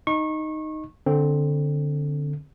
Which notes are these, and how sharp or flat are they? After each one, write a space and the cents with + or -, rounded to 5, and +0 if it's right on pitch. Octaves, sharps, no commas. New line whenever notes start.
D#4 +0 C#6 -30
D3 +0 C4 +5